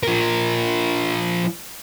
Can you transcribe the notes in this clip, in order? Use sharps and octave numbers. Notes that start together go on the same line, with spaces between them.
F3 A#4